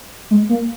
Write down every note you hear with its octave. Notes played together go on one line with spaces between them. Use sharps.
G#3
A#3